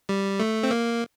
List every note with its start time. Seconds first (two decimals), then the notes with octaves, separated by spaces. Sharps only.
0.09 G3
0.40 A3
0.63 C4
0.71 A#3